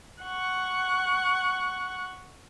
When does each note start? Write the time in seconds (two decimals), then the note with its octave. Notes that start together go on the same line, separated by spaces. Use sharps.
0.23 F#5 C#6